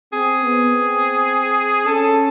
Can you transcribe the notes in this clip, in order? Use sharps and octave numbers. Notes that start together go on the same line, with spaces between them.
C4 G#4
B3
C4
C#4 A4